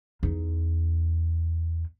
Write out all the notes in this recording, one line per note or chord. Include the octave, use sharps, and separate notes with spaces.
E2 D#4